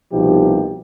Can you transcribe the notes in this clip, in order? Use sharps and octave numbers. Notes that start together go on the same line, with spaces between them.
C2 B2 F3 D#4 G4